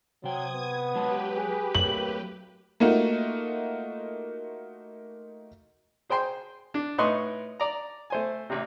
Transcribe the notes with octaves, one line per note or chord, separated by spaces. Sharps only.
C3 F#3 G5 D#6 G#6
B3
F#3 G#3 G4 B4 A5
G#4
F#3 A3 A#3 F#7
A3 A#3 D#4 F4 F#4
G#4 C5 G5 C6
D4
A2 D#4 B4 D#5 C6 C#6
D5 A#5
A3 C5 G#5
A1 C3